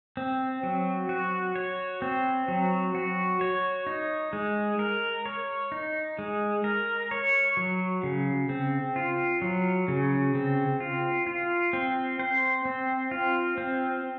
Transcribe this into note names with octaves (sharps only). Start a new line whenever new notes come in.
C4
F#3
F#4
C#5
C4
F#3
F#4
C#5
D#4
G#3
A#4
C#5
D#4
G#3
A#4
C#5
F#3
C#3
C4
F4
F#3
C#3
C4
F4
F4
C4
C5
C4
F4
C4